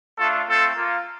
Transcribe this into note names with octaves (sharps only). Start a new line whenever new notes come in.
A3 D4 F4 A4
A3 C4 F4 A4
A#3 F4